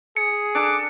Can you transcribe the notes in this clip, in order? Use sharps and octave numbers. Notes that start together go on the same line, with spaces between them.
G#4 C#7
D4 A4 D6